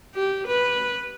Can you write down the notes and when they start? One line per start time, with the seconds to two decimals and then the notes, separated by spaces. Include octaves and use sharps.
0.15 G4
0.48 B4